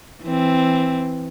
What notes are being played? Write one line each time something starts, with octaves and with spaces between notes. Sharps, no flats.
E3 C4